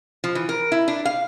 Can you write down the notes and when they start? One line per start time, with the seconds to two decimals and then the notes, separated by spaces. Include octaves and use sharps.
0.24 F3
0.35 E3
0.49 A#4
0.72 E4
0.88 D4
1.05 F5